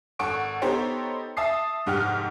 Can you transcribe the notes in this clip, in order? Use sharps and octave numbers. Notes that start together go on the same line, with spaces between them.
G#1 A4 F#5 C#6 D7
B3 D#4 G4 A4 C5 C#5
E5 A5 D#6 C7
F1 G#2 G4 F#5 F6